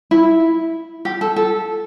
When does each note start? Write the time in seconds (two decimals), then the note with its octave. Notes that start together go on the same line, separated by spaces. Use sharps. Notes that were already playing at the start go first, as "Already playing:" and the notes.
0.11 E4
1.05 G4
1.21 A4
1.36 A4